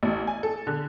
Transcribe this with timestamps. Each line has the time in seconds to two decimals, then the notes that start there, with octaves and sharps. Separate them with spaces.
0.03 A1
0.27 G#5
0.43 A4
0.67 D3